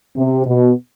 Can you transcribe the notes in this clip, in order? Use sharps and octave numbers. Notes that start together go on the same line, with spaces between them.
C3
B2